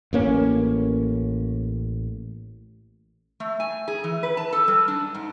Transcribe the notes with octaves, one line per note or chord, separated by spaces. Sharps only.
A1 A#3 C#4
A3
G#5
G#4
E3
B4
A5
A4
G3
D4
G#2